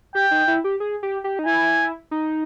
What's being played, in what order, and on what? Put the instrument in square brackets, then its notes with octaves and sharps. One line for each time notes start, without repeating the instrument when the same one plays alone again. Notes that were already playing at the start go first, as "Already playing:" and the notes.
[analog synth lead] G4 [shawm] G5
[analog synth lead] D#4
E4
G4
G#4
G4
G4
D#4
[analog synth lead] E4 [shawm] G#5
[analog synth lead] D#4